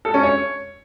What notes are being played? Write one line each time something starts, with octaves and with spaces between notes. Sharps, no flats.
A4
C#4
C#5